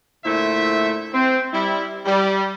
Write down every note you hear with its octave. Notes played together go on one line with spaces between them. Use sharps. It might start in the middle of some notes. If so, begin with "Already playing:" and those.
A#2 D3 A3 E4 C5 E5
C4
G3 E4
G3